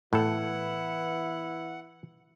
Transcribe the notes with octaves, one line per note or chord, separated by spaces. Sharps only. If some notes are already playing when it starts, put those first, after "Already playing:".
A2 E3 B3 E4 A4 F#5